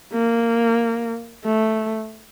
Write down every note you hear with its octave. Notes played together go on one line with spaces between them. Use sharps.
A#3
A3